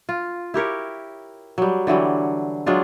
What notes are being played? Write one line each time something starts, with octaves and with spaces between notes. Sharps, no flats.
F4
E4 G4 A#4 C#5
F#3 G3
D3 E3 F#3 G3
F#3 G#3 D4 F4